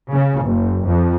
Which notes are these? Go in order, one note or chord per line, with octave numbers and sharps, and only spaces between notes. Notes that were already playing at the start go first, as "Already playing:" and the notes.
C#3
F#1
F2